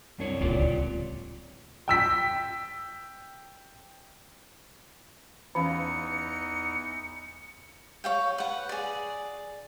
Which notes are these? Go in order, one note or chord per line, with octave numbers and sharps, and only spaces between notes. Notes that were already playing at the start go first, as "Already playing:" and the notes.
C2 F#2 D4 C#5
D1 C#2 A#2 F4 C#5 D5
G5 E6 B6
E2 E3 C#4 D#4 F5 C#7
C#5 F5 G5
B4 F#5
G#4 D5